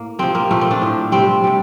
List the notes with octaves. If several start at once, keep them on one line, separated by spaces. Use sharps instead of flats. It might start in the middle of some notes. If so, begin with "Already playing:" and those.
Already playing: A2 A#3
C3 F3 C4
A#3
A#2 F3 A3
C4
D4
A2 F3
C3 G3 C4
C3 G3